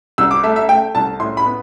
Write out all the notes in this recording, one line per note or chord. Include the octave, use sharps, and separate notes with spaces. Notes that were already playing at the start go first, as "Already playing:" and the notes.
C2 E6
D6
A3 E5
E5
A3 G5
C2 A5
A2 C6
B5
B3